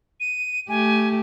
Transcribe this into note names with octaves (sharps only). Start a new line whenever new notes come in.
D#7
A3 G4 G#5